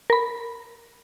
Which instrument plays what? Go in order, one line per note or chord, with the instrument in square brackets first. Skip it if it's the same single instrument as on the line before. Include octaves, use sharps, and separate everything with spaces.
[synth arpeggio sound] A#4 B5